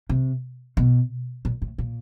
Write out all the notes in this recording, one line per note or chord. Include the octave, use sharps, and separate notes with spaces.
C3
B2
A#2
A2
A#2